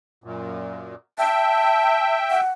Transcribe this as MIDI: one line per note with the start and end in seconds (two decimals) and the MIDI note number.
0.24 0.95 42
0.24 0.95 46
1.19 2.41 76
1.19 2.41 79
1.19 2.19 81
2.30 2.51 78